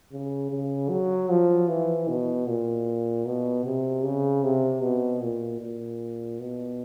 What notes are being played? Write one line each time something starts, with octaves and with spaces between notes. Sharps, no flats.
C#3
C#3
F#3
F3
E3
B2
A#2
B2
C3
C#3
C3
B2
A#2
A#2
B2